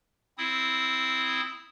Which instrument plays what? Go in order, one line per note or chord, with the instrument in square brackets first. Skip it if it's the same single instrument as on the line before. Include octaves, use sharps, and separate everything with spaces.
[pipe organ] C4 E4 D#6